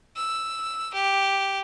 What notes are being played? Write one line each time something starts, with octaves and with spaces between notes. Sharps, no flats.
E6
G4